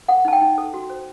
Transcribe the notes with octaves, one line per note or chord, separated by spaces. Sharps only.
A4 F#5
D#4 A5
G5
D#4
A4
F#4
C5